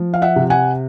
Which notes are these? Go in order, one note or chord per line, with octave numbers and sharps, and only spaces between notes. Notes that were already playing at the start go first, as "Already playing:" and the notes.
Already playing: F3
F5
E5 F#5
C3
F#5 G#5